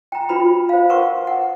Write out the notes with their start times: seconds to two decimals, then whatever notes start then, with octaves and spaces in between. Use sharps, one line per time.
0.12 G5 A#5
0.29 F4 F#4 B4 B5
0.69 C5 F5
0.89 A#4 B4 F#5 C6 C#6
1.27 F#5